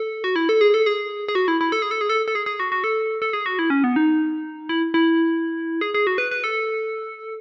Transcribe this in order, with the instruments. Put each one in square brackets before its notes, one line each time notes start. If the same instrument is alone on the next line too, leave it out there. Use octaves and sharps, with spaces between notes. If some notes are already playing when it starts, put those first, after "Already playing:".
Already playing: [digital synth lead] A4
F#4
E4
A4
G#4
A4
G#4
G#4
F#4
E4
E4
A4
G#4
A4
G#4
A4
A4
G#4
G#4
F#4
F#4
A4
A4
G#4
F#4
E4
C#4
B3
D#4
E4
E4
G#4
G#4
F#4
B4
B4
A4